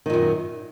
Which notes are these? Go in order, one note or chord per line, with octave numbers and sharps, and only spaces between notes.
F#2 A#2 D#3